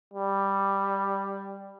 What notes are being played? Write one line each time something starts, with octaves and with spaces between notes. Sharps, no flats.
G3